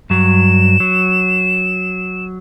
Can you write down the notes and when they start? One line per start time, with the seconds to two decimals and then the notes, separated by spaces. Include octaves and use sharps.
0.10 G2 F#3 E7
0.80 F#3